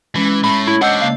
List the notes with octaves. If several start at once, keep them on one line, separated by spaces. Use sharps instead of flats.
E3 G#3 C#4
A2 A3 B5
E4 C#5
D4 C5 D#5 F#5 E6 G6
C#3 A#3 F5